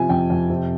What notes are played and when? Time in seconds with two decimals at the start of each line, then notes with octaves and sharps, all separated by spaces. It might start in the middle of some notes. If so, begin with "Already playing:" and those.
Already playing: C3 F3 G#5
0.09 F2 G5
0.30 F2
0.50 C3